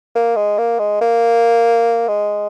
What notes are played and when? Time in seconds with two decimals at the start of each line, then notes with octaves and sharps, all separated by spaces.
0.15 A#3
0.36 G#3
0.58 A#3
0.79 G#3
1.01 A#3
2.08 G#3